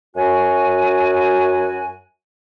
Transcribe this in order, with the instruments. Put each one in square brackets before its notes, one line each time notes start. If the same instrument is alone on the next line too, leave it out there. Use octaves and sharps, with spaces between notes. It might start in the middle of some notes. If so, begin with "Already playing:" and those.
[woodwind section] F#2 F#4 G#5